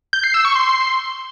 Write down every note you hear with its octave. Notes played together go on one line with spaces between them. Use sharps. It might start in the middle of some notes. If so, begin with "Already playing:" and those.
G6
C7
E6
C#6
C6